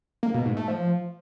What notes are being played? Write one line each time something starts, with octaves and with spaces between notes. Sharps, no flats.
A#3
B2
G#2
A3
F3